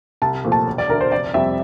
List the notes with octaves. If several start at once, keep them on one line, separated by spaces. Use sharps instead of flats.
C2 A5
A#2 F3 A3
A5
E1
D5
D2 D3 A#4
C5
F1 D5
F2 C3 G3 E5